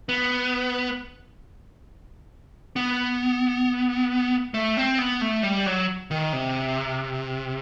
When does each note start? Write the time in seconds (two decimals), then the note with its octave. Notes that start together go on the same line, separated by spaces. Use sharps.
0.09 B3
2.76 B3
4.54 A3
4.77 C4
4.98 B3
5.21 A3
5.43 G3
5.66 F#3
6.11 D#3
6.33 C3